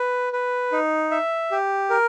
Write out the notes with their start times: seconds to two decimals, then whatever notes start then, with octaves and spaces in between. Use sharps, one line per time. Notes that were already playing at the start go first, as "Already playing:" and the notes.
Already playing: B4
0.33 B4
0.72 D#4
1.11 E5
1.51 G4
1.90 A#4